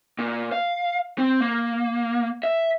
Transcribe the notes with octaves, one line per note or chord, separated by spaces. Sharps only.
A#2
F5
C4
A#3
E5